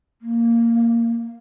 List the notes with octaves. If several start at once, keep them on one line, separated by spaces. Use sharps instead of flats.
A#3